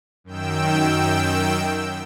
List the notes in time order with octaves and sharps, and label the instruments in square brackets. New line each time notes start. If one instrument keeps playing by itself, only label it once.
[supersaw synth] F#2 D#3 G5 E6